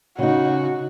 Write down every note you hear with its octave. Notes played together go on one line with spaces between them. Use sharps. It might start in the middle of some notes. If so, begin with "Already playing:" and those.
C#3 D#4 F#4